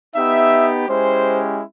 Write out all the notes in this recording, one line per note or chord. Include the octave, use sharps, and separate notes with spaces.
B3 D#4 G4 E5
G#3 C#4 E4 G4 C5